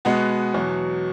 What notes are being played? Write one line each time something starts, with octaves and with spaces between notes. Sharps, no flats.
B2 G#3 B3 F#4
E2 B2 F#3